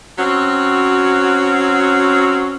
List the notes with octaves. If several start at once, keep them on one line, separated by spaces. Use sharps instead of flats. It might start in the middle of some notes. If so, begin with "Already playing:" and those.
F#3 C4 C#4 F#4